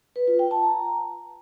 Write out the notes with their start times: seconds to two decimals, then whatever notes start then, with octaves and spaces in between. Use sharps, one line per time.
0.16 B4
0.27 F4
0.39 G5
0.51 A5
0.63 A#5